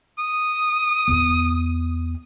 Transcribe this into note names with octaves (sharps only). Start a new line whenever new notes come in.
D#6
E2 B3